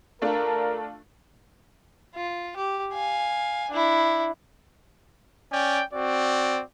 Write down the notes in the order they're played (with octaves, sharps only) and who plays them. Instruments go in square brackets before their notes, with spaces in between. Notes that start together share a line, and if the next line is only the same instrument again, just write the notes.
[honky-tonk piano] A3 D4 F4 [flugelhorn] A#4
[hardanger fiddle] F4
G4
F5 G#5
D4 E4
[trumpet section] C#4 D5 G5
C4 F#4 D5